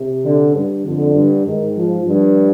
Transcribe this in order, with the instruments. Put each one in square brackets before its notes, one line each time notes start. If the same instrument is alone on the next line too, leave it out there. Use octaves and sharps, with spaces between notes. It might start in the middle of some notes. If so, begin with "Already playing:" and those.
Already playing: [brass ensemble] C3
[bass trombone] D3
G2
[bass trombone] F2 [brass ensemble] D3
[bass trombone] G2
[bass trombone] G#2 [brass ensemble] D#3
[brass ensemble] F3
[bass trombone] G2 [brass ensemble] F3